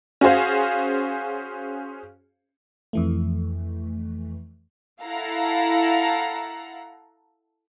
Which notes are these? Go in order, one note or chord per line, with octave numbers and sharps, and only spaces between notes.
C#4 F#4 G#4 C5 F5
F2 E3 A3
E4 A4 F5 F#5 A#5